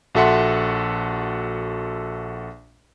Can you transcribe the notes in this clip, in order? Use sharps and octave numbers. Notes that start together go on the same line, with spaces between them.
A#1 F#4 A4 E5 F#5 C6